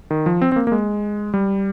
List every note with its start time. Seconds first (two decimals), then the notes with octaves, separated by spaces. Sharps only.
0.11 D#3
0.26 F3
0.42 C4
0.52 C4
0.56 A#3
0.67 A#3
0.72 G#3
1.34 G3